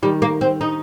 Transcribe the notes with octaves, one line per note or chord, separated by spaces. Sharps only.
D#3 G3
A#3
C4
D#4